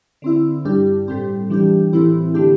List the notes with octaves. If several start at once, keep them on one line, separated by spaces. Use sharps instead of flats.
D3 C4 E4
G2 G3 D4 G4
A2 G3 C4 G4
E3 G3 D4 G4
A2 E3 C4 E4
D3 A3 D4 G4